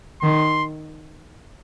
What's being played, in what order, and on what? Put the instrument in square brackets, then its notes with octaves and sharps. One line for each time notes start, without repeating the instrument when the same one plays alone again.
[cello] D#3 [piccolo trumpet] C6